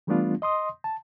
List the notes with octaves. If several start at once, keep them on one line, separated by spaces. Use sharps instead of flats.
E3 G3 A3 B3 D4 F4
D#5 C6 D#6
A5